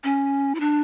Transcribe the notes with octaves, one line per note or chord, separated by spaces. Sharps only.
C#4
E4
D4